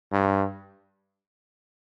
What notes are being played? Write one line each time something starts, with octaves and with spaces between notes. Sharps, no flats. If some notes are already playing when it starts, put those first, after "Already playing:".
G2